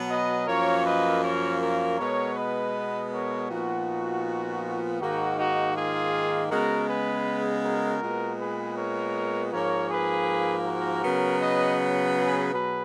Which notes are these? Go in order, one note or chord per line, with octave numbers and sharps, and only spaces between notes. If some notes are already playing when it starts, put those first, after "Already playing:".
Already playing: B2 F#3 B3
B4 D#5
F#2 F3 A#3 A#4 C#5
B4 D#5
A#4 C#5
A#4 C#5
B2 G#3 B3 A#4 C#5
B4 D#5
A#4 C#5
A#2 F3 B3 D#4 F#4
G#2 D#3 A#3 D#4 F#4
D#4 F#4
F4 G#4
C#3 G#3 B3 F#4 A#4
G#4 B4
F#4 A#4
A#2 G#3 B3
G#4 B4
A#4 C#5
G#2 F3 A#3 A#4 C#5
G#4 B4
F#4 A#4
C#3 F#3 B3
B4 D#5
G#4 B4
B2 F#3 G#4 B4